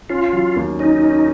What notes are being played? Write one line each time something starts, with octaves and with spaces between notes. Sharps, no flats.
C#4 F4
F#3
D#2
C#4 D#4
C#4